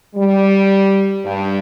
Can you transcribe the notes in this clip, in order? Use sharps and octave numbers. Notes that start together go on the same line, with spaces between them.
G3
G2